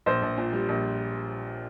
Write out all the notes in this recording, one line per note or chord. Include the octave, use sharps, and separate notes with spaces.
A#1 C5
A#1
A#2
G3
A#1